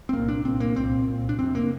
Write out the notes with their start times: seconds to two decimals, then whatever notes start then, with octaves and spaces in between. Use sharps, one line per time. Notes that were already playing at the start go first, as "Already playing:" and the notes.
0.09 C4
0.13 C2 A#2 A#3
0.28 D4
0.45 C2 A#2 C4
0.60 A#3
0.76 C2 A#2 C4
1.08 C2 A#2
1.29 D4
1.39 F2 C3 C4
1.55 A#3